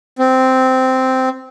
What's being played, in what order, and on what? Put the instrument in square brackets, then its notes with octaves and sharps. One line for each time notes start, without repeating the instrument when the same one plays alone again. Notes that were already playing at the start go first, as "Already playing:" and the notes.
[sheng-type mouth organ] C4